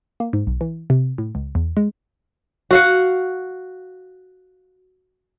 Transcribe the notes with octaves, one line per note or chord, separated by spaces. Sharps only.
A#3
G#2
B1
E3
C3
A2
C#2
E2
G#3
F#4 F5 F#5